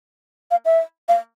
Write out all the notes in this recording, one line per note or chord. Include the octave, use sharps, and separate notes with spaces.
F5
E5
F5